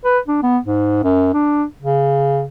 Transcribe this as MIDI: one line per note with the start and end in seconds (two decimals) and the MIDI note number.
0.05 0.19 71
0.28 0.38 62
0.42 0.58 59
0.65 1.03 44
1.04 1.31 42
1.33 1.64 62
1.82 2.44 49